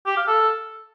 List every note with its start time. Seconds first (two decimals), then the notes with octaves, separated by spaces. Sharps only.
0.06 G4
0.17 F5
0.28 A4